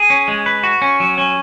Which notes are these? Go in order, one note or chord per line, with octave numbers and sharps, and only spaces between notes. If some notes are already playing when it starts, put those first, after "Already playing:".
Already playing: G#4
C#4
G#3
B4
F#4
C#4
F#3
C#4